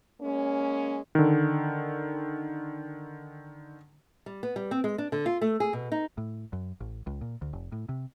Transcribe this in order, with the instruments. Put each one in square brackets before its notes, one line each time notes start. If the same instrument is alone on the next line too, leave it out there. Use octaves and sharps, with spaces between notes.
[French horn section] G#3 A#3 C#4
[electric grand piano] D3 D#3
[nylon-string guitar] G3
B3
G3
C4
G#3
D4
D3
F4
A3
G#4
B2
D#4
[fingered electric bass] A2
F#2
A1
C#2
A#2
D2
F1
A2
C3